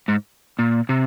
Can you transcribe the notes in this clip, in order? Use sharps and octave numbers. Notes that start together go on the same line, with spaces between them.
G#2
A#2
C3